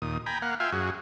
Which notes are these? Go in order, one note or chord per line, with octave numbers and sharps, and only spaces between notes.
D#2 A#2 D#6
G5 G#5 A#5 B5
A#3 F5 F#5
F4 E5 F5 G5 G#5
F#2 F#4 G#4